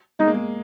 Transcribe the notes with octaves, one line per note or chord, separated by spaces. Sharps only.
G#3 D#4
A#3
G#3